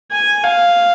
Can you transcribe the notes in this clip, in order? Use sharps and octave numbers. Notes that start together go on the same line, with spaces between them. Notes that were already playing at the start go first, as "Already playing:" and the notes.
G#5
F5